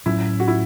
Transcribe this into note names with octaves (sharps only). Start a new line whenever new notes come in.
A2 F#3 C#4 E4
F#4
E4